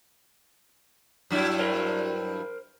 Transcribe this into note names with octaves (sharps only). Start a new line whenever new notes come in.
G2 F#3 E4
A#4 C5